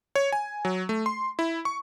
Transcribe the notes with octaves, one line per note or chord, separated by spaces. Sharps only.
C#5
G#5
F#3
A3
C6
E4
C#6